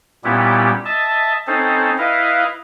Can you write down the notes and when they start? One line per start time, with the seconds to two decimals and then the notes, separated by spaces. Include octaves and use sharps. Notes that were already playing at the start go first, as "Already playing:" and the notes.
0.24 A#2 G3 B3 C#4 E4 G4
0.85 D#5 E5 A5
1.47 C4 C#4 D#4 A4 C5
1.98 E4 B4 D#5 F5